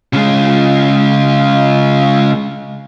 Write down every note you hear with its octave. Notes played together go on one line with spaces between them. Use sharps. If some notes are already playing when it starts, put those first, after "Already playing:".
C#3 G#3